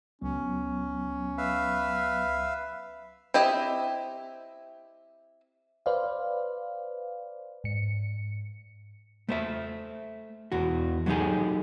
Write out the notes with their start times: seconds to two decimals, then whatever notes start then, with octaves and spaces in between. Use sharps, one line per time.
0.21 C#2 F#3 B3 C#4
1.38 B4 E5 F5
3.34 C4 E4 G4 D#5 E5
5.86 B4 C5 D5 F5
7.64 G#2 C#7
9.29 A3 C5 E5
10.52 E2 E3 F#4
11.06 F#3 A3 B3 D#4 G4 G#4